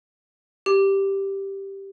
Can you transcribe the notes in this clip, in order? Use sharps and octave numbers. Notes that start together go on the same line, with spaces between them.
G4